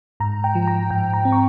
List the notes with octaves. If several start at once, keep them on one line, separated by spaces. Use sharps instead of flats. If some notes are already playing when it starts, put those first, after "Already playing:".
G#2 A#5
G5
F3
A#5
G#2 G5
A#5
C4
C#6